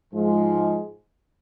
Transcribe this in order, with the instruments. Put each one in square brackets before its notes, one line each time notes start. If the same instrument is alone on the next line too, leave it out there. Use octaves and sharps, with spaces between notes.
[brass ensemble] G#2 F3 G#3